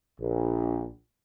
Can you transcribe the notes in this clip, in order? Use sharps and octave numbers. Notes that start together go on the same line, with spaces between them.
A#1